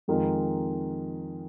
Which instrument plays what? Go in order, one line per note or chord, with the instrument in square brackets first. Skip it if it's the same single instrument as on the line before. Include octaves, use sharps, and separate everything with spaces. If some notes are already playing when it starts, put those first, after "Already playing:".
[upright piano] F2 D#3 G#3 F4 A#4